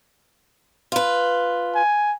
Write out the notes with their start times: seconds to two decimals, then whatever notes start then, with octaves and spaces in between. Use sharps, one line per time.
0.92 F4 B4
1.75 G#5